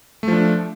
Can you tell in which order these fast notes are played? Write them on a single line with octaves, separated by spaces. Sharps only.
A3 F3 D4